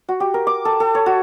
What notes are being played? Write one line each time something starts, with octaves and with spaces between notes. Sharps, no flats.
F#4
G4
A#4
D6
A4
A4
C#5
F#4